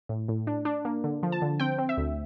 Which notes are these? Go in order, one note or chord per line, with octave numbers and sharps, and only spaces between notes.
A2
A2
D4
D4
A#3
D3
F3
A5
D3
C4 G5
C4
E5
D2